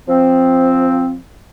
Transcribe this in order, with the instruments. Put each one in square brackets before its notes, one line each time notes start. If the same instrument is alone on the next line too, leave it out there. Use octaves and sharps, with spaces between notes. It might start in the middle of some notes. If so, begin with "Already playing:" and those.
[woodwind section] F3 C4